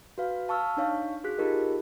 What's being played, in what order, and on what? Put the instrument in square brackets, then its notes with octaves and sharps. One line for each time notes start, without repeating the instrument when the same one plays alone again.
[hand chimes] F#4 B4 F5
F5 A5 C#6 E6 F6
D4 D#4 C#5 F5 C#6
F#4 G#4 F#6 B6
D#4 F4 G4 G#4 A#4 D#5